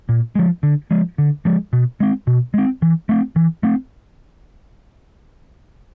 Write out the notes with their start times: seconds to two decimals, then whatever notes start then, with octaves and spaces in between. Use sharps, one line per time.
0.09 A#2
0.35 F3 G#3
0.63 D3
0.91 F3 G#3
1.18 D3
1.45 F3 G#3
1.73 B2
2.00 G#3 C4
2.27 B2
2.54 G#3 C4
2.82 E3
3.09 A3 C4
3.36 E3
3.63 A3 C4